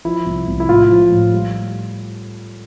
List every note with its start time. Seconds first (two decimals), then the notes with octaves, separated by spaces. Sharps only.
0.05 F3 E4
0.26 C2
0.48 C2
0.60 E4
0.69 A2 F4
0.90 F3
1.10 A2
1.32 G3